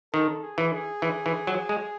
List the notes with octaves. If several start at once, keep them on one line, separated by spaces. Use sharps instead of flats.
D#3 A4
G#4
E3
G#4
E3
E3
F#3
G#3